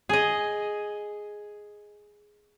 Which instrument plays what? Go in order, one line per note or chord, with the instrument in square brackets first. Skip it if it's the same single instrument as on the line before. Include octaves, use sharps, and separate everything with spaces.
[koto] G#4 D#5